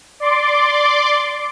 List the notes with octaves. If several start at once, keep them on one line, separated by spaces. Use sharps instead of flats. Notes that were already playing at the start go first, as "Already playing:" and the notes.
D5 C6 D6